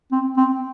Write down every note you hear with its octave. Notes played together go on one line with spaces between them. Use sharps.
C4
C4